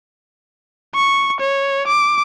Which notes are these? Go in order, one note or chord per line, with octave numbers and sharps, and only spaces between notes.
C#6
C#5
D6